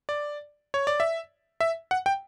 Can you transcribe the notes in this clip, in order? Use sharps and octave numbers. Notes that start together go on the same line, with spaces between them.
D5
C#5
D5
E5
E5
F#5
G5